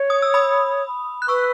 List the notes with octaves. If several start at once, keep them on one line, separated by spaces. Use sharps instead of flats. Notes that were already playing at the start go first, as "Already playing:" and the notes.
Already playing: C#5
D#6
E6
B5 D#6
F#6
B4 C#6 E6